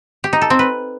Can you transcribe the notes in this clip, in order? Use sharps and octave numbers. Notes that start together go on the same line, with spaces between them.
G4
D#4
A4
C4
B4